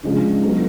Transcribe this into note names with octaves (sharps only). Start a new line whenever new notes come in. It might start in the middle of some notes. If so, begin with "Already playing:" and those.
C#3 F3 G#3 D4
F#3 B3 F4 A4